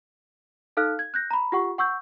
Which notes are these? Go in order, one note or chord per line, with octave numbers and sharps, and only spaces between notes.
D#4 A4 F5 F6 F#6
G#6
F#6 G6 A#6
A#5 B5
F4 G4 F#5 C#6
F#5 C#6 E6 G6